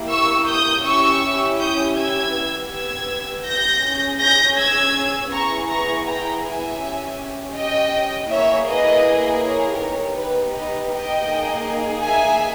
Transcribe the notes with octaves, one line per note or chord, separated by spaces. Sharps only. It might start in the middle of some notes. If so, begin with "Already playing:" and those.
Already playing: A#3 E4 G4
C#6 E6
D#6 G6
C#4 E4 G4 C#6 E6
D#6 G6
E6 G#6
B3 G4
E6 G#6
G6 A#6
C#4 G#4
G6 A#6
E6 G#6
B3 E4 G#4 A#5 C#6
A#5 C#6
G5 A#5
E5 G#5
C#4 G4
D#5 G5
A#3 E4 G#4 C#5 E5
B4 D#5
A#4 C#5
B3 D#4 G4
B4
B4 D#5
D#5 G5
A#3 D#4 G#4
E5 G#5